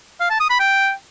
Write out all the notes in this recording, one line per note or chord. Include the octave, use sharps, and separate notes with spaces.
F5
A5
D#6
B5
G5